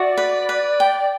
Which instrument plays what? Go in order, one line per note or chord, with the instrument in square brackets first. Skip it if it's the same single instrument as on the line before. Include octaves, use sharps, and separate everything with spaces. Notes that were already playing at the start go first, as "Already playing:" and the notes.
Already playing: [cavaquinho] F#4 E5 [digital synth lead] D5
[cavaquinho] B4
B4
G5